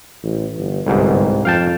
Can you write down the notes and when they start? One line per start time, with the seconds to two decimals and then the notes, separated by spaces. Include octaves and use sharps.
0.23 A1
0.57 G1
0.87 G1 C2 G#2
1.45 F2 F5 G5 A5